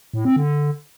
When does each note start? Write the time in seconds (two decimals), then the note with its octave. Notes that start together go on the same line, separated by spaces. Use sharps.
0.14 A2
0.25 C4
0.36 D3